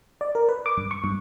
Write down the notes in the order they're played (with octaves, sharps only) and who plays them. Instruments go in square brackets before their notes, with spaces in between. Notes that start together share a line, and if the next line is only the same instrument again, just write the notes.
[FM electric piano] D5
A#4
B4
D6
G2
C#6
G2